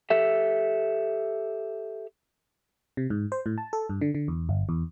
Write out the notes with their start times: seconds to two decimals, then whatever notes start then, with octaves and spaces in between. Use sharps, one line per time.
0.10 G4 A4 E5
2.97 C3
3.10 G#2
3.32 C5
3.46 A2
3.58 A5
3.73 A4
3.90 G2
4.01 D3
4.15 D3
4.28 E2
4.49 G1
4.69 E2